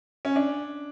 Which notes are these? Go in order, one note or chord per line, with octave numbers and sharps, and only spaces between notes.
C#4
D4